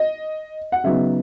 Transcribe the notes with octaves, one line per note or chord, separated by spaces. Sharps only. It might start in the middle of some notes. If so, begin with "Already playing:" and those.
Already playing: D#5
F#5
C#3 F#3 B3 D#4 E5